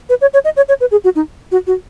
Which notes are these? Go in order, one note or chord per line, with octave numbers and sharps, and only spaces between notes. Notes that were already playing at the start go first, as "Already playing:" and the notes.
B4
C#5
C#5
D#5
C#5
C#5
B4
G#4
F#4
D#4
F#4
F#4